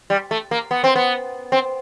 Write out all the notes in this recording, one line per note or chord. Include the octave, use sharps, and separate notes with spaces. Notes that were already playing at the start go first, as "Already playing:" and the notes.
G3
A3
A#3
B3
C4
B3
C4